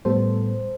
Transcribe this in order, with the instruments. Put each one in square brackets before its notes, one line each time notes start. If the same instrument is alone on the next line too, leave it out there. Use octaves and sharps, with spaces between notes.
[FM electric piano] A2 G3 B3 A4 C5